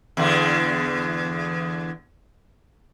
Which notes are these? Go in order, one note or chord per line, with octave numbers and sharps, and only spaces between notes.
E2 D3